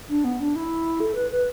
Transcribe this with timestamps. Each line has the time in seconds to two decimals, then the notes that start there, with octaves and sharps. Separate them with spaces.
0.09 D4
0.24 B3
0.40 D4
0.56 E4
1.00 A4
1.15 B4
1.31 B4